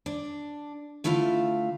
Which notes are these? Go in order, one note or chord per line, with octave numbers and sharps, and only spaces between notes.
D4
D3 A3 E4 F4 F5